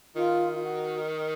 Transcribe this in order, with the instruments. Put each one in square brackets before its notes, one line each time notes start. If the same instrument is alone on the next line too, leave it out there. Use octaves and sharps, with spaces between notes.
[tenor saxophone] D#3 [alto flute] F4
[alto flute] F4
F#4